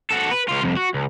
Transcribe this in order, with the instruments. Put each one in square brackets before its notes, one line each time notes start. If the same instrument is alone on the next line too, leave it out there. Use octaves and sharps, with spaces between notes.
[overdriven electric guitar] F#4 A4
B4
C#2 F4
C2 F2
F#4
C#2